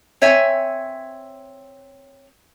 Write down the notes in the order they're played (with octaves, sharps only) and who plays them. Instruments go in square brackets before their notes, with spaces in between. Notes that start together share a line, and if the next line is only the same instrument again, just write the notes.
[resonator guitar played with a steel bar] C4 C#5 E5 G#5